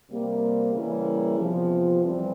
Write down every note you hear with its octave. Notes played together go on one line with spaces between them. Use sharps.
C3 G3 A#3
C#3 E3 G3 A#3 E4
E2 C3 F3
F2 E3 G3 C4